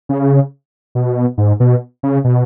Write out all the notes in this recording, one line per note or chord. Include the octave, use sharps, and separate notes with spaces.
C#3
B2
G#2
B2
C#3
B2